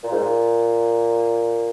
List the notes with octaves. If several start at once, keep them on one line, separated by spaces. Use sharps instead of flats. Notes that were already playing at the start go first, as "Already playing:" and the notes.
A#2
G#2
A#2